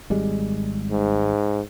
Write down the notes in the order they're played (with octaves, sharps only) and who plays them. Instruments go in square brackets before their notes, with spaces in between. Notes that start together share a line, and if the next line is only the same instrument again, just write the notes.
[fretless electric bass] G#1 G3 G#3
[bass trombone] G#2